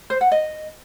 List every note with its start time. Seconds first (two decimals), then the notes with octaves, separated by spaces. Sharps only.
0.10 C5
0.21 F#5
0.32 D#5